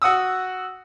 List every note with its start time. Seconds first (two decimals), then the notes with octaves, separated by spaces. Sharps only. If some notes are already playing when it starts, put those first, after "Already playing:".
0.02 F#4 F#5 D#6 E6